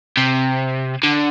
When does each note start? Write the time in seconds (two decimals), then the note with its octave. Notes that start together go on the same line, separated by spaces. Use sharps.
0.17 C3
1.04 D3